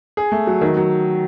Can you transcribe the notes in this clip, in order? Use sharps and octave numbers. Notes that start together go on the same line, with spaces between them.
G#4
A3
F#3
D#3
F#3